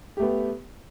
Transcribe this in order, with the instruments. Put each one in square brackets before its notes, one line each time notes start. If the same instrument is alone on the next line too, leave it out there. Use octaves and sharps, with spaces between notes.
[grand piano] G4
A3
B3